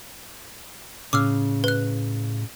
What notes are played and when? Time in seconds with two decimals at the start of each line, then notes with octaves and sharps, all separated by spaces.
1.13 A2 C#3 D6 E6 F6
1.64 B4 F#6